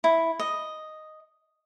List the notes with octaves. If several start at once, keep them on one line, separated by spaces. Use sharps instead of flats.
E4
D#5